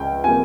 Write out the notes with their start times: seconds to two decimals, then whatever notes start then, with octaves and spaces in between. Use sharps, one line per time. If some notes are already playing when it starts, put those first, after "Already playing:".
Already playing: C#2 G5
0.24 C3 F3 A#3 G#5